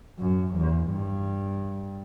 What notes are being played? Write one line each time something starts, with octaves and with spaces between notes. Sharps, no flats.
F#2
E2
G2